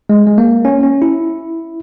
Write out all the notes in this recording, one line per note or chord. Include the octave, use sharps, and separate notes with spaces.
G#3
G#3
A#3
C#4
C#4
E4